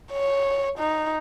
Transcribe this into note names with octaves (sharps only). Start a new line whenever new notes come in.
C#5
D#4